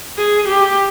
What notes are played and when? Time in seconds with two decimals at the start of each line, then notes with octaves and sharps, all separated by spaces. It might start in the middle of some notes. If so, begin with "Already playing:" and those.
0.18 G#4
0.48 G4